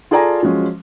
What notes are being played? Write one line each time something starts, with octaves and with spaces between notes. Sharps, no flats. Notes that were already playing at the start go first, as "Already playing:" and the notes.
F4 G#4 A4 D5 G#5 A#5
F3 F#3 G#3 C#4